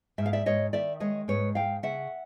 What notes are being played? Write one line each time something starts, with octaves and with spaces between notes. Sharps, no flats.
G#2 E5
F5
D5 E5
G#2 C#5 D#5
D#3 D5 E5
G#3 C#5 D#5
G#2 B4 C#5
G#2 F5 G5
C#3 E5 F#5